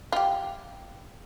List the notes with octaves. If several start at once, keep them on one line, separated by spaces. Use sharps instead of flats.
F4 G4